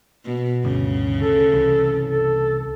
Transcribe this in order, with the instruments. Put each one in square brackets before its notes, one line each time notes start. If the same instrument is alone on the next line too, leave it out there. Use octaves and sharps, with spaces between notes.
[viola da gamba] B2
[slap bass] G1 D2 G2 [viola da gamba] C#3
[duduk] A4
[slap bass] C2 E3
[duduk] A4